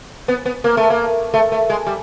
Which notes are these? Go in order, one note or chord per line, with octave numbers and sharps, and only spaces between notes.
B3
B3
A#3
A3
A#3
A3
A3
G#3
G3